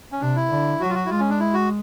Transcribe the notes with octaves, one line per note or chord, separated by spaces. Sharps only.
C#4
C3 D4
E4
D3
F#3 F#4
F4
F#4
E4
G#3 F4
C#4
D4
E4
F#4